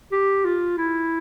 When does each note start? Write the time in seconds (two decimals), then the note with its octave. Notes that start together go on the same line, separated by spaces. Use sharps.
0.12 G4
0.45 F4
0.77 E4